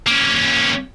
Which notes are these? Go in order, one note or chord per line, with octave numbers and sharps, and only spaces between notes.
A#3 C#4